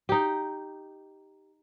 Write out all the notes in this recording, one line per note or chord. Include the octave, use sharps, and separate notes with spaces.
D#4 G4